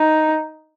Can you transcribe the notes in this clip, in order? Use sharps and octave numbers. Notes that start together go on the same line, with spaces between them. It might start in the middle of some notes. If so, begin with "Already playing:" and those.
Already playing: D#4